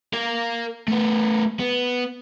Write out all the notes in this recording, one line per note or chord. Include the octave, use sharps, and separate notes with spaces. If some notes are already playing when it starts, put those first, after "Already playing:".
A#4 F5
A3 B3
B3